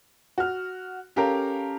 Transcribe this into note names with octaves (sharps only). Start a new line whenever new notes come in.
F#4 F6
C#4 G4 A4 A#4 F5 A#5